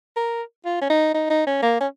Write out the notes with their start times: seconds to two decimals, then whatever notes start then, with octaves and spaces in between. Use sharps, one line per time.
0.16 A#4
0.65 F4
0.81 C#4
0.90 D#4
1.14 D#4
1.30 D#4
1.47 C#4
1.62 A#3
1.81 C#4